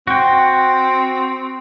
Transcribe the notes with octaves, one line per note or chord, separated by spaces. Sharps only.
C4 F#4 G5